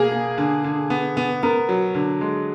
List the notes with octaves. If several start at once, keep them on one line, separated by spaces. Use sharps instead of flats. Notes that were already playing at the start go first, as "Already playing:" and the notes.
Already playing: B2 A#3 G#4
A#3
D3
D3
B3
B3
B3 A#4
F#3
D3
G#3